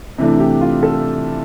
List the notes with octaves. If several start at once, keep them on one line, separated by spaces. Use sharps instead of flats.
C3 E3 A3 D4
G4
F4
A4